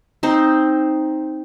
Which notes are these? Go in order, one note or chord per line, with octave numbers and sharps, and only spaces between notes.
C4 D#4 C5